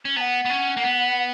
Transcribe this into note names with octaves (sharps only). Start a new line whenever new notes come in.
C#4
B3 F#5 A#5
B3
C#4
A#3
B3